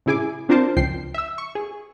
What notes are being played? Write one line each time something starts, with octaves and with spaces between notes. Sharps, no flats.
A2 C#3 E4 G#4 G#5 D6
C4 D4 F4 A#4 C5 A5
C#2 F3 G5 C7
E5 E6
C#6
G#4